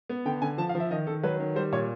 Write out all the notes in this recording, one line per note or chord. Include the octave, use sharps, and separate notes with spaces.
B3
D3 G5
D3 G#5
F3 A5
F5
F3
E5
D#3 D#5
D#3 A4
F#3 B4
D#3
G3 C5
A#2 C#5